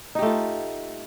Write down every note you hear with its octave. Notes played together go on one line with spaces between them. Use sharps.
A3 D#4 F4 G4